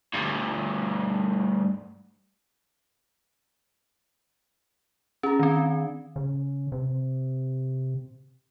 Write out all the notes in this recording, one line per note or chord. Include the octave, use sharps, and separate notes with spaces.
D2 G2
C#4 G#4 A#5
D#3 C4
D4
C#3
C3